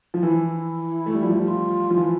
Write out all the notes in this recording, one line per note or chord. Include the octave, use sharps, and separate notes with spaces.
F3
E3 E4
E4
A3
G3
F3
G3
E4
F4
F3
E3